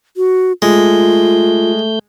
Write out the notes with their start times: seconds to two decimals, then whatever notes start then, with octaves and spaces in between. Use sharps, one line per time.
0.17 F#4
0.62 G#3 A3 F4 G6